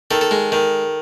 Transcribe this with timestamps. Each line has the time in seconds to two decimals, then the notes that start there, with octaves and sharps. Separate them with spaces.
0.11 D#3 A4
0.21 A4
0.31 G#3
0.52 D#3